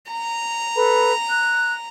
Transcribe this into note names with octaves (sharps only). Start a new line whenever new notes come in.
A#5
A4 B4 B5
F#6